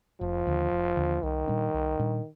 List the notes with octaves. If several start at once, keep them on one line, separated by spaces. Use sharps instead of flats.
F1 F3
D#2 D3
F1
D#2 D3
C2 D#3
A#2 G3 D4
C2
A#2 G3 D4